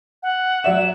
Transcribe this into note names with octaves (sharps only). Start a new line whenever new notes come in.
F#5
F#3 D5 E5 E7